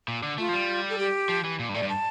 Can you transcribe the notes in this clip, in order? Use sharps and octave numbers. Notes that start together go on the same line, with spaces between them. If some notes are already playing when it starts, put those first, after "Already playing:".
A#2
D3
A3 F4
F3
G3
A4
G4
F3
E3
A#2
G2
A2 D5
G2
A5